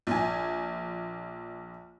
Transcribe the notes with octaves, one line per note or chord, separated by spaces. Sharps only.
A#1 G#5